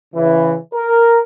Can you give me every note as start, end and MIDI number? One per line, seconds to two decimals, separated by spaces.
0.15 0.55 49
0.15 0.55 52
0.74 1.19 70